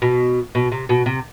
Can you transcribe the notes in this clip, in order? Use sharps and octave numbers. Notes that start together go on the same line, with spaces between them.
B2
B2
C3
B2
C3